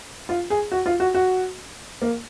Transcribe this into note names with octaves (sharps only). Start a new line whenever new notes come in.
F4
G#4
F#4
F4
F#4
F#4
A#3